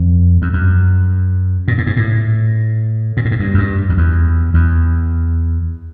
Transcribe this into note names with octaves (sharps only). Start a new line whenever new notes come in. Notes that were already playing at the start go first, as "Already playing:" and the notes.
Already playing: F2
F2
F#2
A#2
A2
G#2
A2
A#2
A2
G#2
G2
F#2
G2
F2
E2
E2